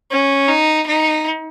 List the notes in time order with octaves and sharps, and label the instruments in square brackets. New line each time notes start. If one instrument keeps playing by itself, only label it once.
[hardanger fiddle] C#4
D#4
D#4